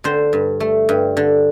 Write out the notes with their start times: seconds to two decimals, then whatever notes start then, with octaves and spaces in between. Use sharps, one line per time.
0.04 D3 C5
0.33 G2
0.60 A3
0.89 G2
1.17 D3